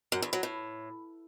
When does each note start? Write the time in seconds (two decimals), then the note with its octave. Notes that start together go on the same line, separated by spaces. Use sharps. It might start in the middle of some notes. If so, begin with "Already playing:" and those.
0.12 F#2
0.22 E2
0.33 F#3
0.43 A2